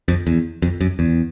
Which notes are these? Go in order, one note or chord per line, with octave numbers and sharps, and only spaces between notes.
F2
E2
F2
F#2
E2